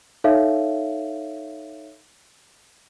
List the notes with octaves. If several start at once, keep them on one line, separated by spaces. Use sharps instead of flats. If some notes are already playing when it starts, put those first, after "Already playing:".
D#4 A4 C#5 E5 F5